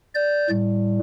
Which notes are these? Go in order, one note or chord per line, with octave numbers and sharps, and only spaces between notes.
D5 G6
A2 G3